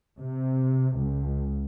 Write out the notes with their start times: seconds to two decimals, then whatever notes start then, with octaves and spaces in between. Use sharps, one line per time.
0.19 C3
0.97 C#2